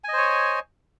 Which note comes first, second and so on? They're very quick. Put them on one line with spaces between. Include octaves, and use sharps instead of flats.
G#5 D#5 C5 C#5